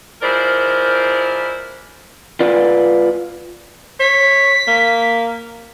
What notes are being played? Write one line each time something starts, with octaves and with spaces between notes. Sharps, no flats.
F3 G#3 E4 A#4 C5 D5
F4 B4 D5
C#5 B6
A#3